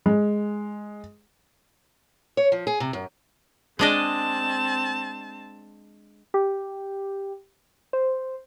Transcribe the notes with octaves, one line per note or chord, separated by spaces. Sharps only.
G#3
C#5
F3
G#4
C3
F#2
G#3 C4 D4 D#5 A5
G4
C5